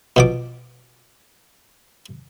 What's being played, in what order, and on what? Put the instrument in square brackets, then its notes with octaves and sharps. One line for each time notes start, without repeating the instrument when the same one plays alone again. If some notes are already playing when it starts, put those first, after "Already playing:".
[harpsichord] B2 F3 D6